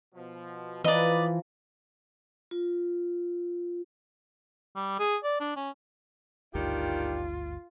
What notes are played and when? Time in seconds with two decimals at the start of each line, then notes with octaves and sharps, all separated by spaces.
0.15 B2 F3
0.84 E3 F3 B4 D5 D#5 F5 A#5
2.51 F4
4.76 G3
4.99 G#4
5.24 D5
5.40 D4
5.56 C#4
6.55 G#1 D2 G2 D#3 D4 F4 G4